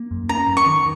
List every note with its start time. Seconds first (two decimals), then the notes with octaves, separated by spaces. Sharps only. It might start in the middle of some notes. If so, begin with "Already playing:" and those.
Already playing: A#3
0.11 F#2
0.29 C#4 A#5
0.48 F#2
0.57 C#6
0.66 D#3